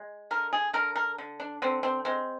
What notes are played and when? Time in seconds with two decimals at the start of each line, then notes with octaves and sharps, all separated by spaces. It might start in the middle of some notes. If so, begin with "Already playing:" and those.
Already playing: G#3
0.31 D3 A#4
0.53 G#4
0.73 D3 A#4
0.96 A#4
1.18 D3
1.40 D4
1.62 D3 C4
1.83 C4
2.05 G#3 C4